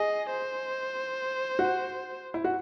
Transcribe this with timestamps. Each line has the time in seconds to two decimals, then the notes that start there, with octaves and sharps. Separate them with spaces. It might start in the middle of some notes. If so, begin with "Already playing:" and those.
Already playing: G#4 D#5
0.31 C5
1.59 F#4
2.34 E4
2.44 F#4